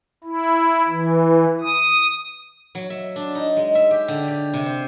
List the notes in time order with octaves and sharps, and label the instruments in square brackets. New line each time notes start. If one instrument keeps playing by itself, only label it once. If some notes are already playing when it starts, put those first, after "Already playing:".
[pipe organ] E4
E3
D#6
[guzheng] F#3
E5
D4
D#4
G#3
E5
G4
D3
G4
C3
C5